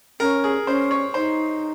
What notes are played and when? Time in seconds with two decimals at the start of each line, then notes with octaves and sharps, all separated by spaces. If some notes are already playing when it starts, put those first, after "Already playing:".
0.20 C#4 A#4
0.44 G#4
0.67 C#4 C5
0.91 C#5
1.14 D#4 C5